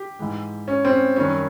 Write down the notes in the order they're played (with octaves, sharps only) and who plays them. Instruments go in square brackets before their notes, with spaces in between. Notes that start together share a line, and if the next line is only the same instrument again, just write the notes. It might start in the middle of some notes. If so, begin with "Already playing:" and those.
Already playing: [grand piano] G4
G#2 E3 G#3
C#4
C4
C#4
F#2 D#3 G3 C#4